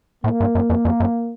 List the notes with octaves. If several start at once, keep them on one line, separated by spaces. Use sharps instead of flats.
A2 A#3
G2
F#2
F2
F2
F#2